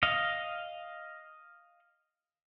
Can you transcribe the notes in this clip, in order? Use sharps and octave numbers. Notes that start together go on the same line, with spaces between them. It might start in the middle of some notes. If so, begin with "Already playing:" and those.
D#5 F5